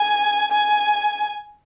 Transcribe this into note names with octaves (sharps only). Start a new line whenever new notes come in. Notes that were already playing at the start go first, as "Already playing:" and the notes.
Already playing: G#5
G#5